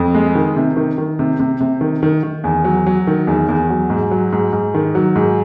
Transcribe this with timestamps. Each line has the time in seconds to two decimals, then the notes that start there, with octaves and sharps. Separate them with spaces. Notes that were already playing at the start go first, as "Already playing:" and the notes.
Already playing: F2
0.15 G#3
0.35 D#3
0.56 C3
0.77 D#3
0.98 D#3
1.19 C3
1.40 C3
1.60 C3
1.81 D#3
2.03 D#3
2.23 D#3
2.44 E2
2.64 F#3
2.86 F#3
3.07 D#3
3.27 E2
3.49 E2
3.70 F#3
3.90 G#2
4.11 F#3
4.32 G#2
4.53 G#2
4.74 D#3
4.95 F#3
5.16 G#2